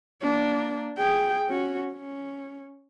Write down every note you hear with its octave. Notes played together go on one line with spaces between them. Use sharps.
A#3 D4
G#4 G5
C#4 F#4
C#4